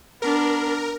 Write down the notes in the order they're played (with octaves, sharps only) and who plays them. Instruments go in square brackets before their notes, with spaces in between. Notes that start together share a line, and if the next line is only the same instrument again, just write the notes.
[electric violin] B3 D4 [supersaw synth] A#4